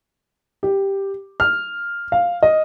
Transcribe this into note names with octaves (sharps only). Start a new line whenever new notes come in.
G4
F6
F5
D#5